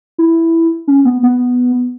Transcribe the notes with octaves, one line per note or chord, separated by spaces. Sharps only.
E4
C#4
B3
B3